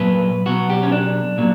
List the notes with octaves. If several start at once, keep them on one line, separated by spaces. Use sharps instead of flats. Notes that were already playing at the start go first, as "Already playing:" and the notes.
Already playing: A#2 F#3 B4
B2 F#3 F#4
G4
C#4
D4
A#2 F#3